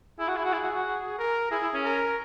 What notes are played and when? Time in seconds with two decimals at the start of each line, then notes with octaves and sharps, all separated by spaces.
0.20 E4 G#4
0.28 F#4
0.36 E4
0.44 F#4
0.53 E4
0.63 F#4
0.74 F#4
1.19 A#4
1.51 E4 G#4
1.62 E4
1.74 C#4
1.84 A#4